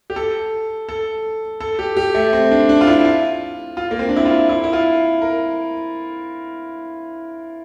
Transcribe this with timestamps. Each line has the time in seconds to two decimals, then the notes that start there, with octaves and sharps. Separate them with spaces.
0.10 G4
0.16 A4
0.89 A4
1.61 A4
1.79 G4
1.97 G4
2.15 A3
2.33 C4
2.51 D4
2.69 D4
2.81 F4
2.87 E4
3.05 F4
3.77 F4
3.91 A#3
3.99 C4
4.09 D4
4.16 E4
4.25 F4
4.49 E4
4.64 E4
4.73 F4
5.22 A#4